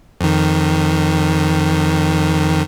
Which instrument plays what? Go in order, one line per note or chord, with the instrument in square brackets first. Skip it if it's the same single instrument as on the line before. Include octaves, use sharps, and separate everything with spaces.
[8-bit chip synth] F2 D#3